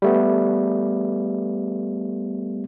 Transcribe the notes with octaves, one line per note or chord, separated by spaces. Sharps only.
G3 A3 B3